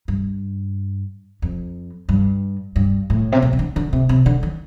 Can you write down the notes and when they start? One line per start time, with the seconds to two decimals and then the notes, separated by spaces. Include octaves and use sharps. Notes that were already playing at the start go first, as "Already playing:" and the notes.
0.08 G2
1.42 F2
2.09 G2
2.76 G2
3.10 A2
3.32 C3
3.42 A#2
3.53 C3
3.59 D3
3.76 D3
3.93 C3
4.09 C3
4.26 D3
4.43 D#3